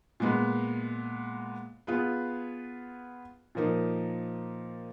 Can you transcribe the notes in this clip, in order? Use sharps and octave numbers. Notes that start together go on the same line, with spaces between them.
A#2 G#3 B3
B3 F4 G#4 B4
A#2 F3 A#3 D#4 A#4